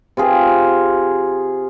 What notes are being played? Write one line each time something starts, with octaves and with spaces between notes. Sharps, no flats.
C3 F4 G#4